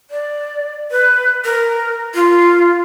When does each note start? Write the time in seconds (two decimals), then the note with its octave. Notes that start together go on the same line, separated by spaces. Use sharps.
0.11 D5
0.91 B4
1.45 A#4
2.15 F4